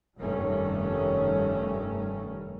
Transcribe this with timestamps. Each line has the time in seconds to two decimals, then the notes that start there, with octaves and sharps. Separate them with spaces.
0.18 F1 G2 D#3 G3 A3 C#4